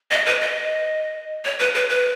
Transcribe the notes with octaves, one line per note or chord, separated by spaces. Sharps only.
D#5
B4
D#5
C#5
B4
B4
B4